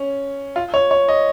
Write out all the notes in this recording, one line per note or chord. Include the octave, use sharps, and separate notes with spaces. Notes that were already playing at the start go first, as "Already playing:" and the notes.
Already playing: C#4
F4
C#5
C#5
D#5